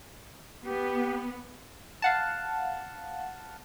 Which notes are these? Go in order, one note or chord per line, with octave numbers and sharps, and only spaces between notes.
B3 G4
F5 F#5 A5